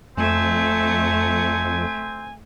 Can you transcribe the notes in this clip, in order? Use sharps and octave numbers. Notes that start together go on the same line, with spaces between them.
F2 A3 C4 G#5